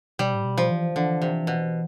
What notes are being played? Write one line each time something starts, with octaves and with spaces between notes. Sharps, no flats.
B2 G3
A2
B2
F3
E3
D3 E3
C3
B2